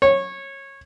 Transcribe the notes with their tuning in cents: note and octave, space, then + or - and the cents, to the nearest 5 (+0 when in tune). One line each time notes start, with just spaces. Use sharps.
C#5 -20